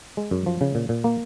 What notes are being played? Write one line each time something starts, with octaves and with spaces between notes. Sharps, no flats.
G#3
F#2
F3
C#3
A#2
A#2
A#3